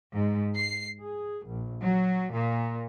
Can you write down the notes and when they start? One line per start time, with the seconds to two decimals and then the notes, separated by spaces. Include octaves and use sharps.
0.13 G#2
0.56 C7
1.01 G#4
1.47 A#1
1.82 F#3
2.33 A#2